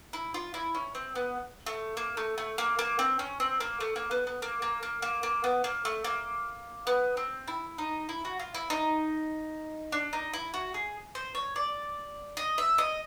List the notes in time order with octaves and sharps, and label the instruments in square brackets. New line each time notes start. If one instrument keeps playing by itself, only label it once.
[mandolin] E4
F4
E4
C#4
C4
B3
A3
A#3
A3
A3
A#3
A#3
C4
C#4
C4
A#3
A3
A#3
B3
B3
A#3
A#3
A#3
A#3
A#3
B3
A#3
A3
A#3
B3
C4
E4
D#4
E4
F#4
F4
E4
D#4
D4
D#4
E4
F#4
G#4
C5
C#5
D5
D#5
E5
D#5